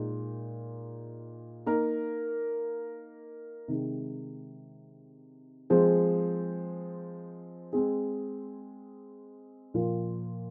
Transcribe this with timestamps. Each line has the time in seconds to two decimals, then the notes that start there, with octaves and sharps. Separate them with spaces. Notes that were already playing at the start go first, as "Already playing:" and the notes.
Already playing: A#2 G#3 D#4
1.66 A#3 D#4 A#4
3.68 C3 D#3 G#3
5.70 F3 G#3 C4 G#4 C5
7.73 G#3 C4 G#4
9.74 A#2 F3 A#3 F4